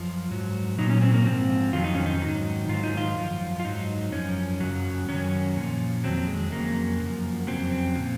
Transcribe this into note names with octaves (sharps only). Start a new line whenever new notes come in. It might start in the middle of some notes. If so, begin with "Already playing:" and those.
Already playing: F#2 F3
G#2 F#3
A#2 F#3 D#4
C#4
C4
A#3
G#2 F3 C4
F2 D#3 F#3 F4
D#4
C#4
D#4
G#2 D#3 F#3
G#2 D#3 F#3 F4
D#4
F4
F#2 F3
F4
G#2 F#3 D#4
F#2 F3 C#4
F#2 C#3 F#3
F#2 D#3 F#3 C#4
A#2 F3
F2 D#3 F#3 C4
G#3
F2 C#3 F#3 A#3
F#2 F3
F2 C#3 F#3 C4
A#2 F3